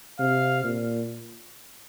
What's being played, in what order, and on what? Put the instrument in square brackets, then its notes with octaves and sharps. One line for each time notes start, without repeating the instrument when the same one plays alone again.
[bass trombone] C3 [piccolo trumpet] F5
[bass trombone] A#2